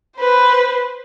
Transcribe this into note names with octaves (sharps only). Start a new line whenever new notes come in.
B4 C5